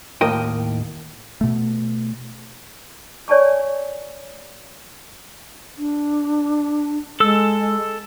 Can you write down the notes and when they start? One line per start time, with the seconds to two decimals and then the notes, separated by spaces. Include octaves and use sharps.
0.21 D#2 A2 A#4 D#5 G5
1.41 B2 A3
3.28 C#5 D5 G#5 A5 C#6
5.78 D4
7.20 G#3 A4 E6